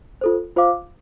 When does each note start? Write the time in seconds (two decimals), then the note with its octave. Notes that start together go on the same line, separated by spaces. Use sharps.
0.21 F4 A4 C5
0.56 F4 C5 F5 D6